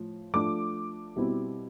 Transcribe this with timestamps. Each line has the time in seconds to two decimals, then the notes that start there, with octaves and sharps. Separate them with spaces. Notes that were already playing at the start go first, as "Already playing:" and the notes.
Already playing: A2 F3
0.34 F3 A3 D4 D6
1.16 B2 G3 C4 E4